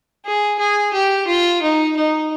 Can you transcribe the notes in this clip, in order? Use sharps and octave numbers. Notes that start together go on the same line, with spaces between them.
G#4
G#4
G4
F4
D#4
D#4